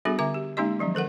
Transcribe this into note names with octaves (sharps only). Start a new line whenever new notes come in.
G3 B3 D4 F#4 G#4 A4
D3 E5 G#5 D6
G4
G#3 A#3 C#4 D#4 G4 D#5
D#3 F3 F#3 C#4
D#3 A4 A#4 F#5